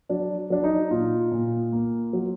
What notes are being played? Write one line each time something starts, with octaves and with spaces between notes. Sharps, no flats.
F#3 D4
F#3 D4
D#4
A#2 F4
A#2
A#3
F#3